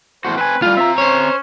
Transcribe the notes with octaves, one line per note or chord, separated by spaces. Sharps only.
E2 A2 F#4 C5
C4 B4 G#5
A2 G3 F4 F5
C4 E5 A#5
C#4 C5 C#5